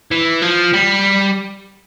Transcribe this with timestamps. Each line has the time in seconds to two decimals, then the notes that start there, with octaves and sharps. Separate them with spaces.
0.11 E3
0.42 F3
0.73 G3